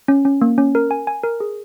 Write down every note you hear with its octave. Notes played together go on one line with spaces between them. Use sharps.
C#4
C#4
A#3
C#4
A#4
G#5
G#5
A#4
G#4